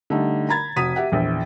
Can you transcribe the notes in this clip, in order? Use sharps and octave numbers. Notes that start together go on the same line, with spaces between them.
D3 G3 A3 D#4
A#5 B5 G#6 A6
F1 F#4 D#6 B6 D#7
G4 E5 F#5
A#1 E2